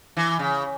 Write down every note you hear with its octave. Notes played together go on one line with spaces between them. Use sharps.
E3
C#3